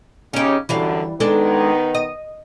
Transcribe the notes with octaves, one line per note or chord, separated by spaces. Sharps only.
C#3 C#4 D#4 G4
F#2 D3 E3 G3 F5
D#3 G#3 B3 D4 D#4 A4
D#5